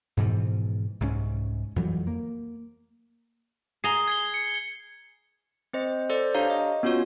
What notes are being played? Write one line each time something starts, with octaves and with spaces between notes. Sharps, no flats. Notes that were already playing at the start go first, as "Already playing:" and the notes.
G#2 B2 E3 F3
C2 G#2 F#3 C#4
F2 E3 F#3 G3
A#3
G#4 A#5 C7 G7
G#6 C7 G7
C#7
C4 C5 D#5
A4 C5 D5
D4 G4 C#5 F5 A#5
D#5
B3 C#4 F4 F#4 C#5